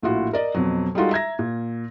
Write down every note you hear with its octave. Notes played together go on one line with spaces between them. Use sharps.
A#1 A2 F4 F#4
A#4 D5 D#5
F2 B2 F#3
G3 G#3 D#4 F4 F#4 A4
E5 A#5 G#6 A#6
A#2